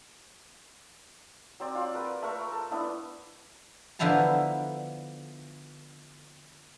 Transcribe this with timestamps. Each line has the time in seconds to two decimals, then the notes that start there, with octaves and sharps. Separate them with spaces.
1.60 F#3 C4 D5
1.75 F4 D6
1.94 A#4 B4
2.22 A3 A#4 C#6
2.52 A4
2.71 B3 D4 E4
3.99 D3 F3 B3 E4 A5 A#5